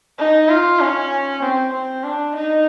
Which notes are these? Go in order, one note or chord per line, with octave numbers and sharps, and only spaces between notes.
D#4
F4
C#4
C4
C4
D4
D#4